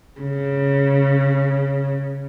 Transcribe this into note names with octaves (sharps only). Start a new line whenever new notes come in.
C#3